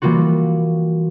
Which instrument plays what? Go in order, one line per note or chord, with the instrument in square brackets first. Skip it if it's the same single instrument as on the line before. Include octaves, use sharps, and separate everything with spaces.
[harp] E3 G3 A#3 F4 F#4